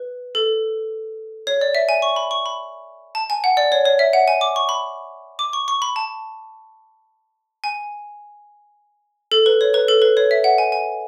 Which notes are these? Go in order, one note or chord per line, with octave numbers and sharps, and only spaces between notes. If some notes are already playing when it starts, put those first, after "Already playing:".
Already playing: B4
A4
C#5
D5
E5
G#5
C#6
B5
C#6
B5
A5
G#5
F#5
D5
C#5
C#5
E5
F#5
G#5
D6
C#6
B5
D6
C#6
C#6
B5
A5
G#5
A4
B4
C#5
B4
A4
B4
C#5
E5
F#5
G#5
G#5